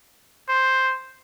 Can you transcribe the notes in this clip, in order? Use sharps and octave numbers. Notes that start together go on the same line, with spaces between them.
C5